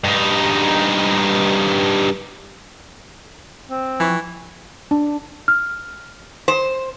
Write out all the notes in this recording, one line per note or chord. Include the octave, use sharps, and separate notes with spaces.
G2 D#4
C4
E3 F3 G5 C#6
D4
F6
C5